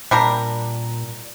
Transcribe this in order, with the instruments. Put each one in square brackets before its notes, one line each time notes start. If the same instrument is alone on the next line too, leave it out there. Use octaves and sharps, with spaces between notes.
[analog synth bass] A#2 [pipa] G3 D4 A#4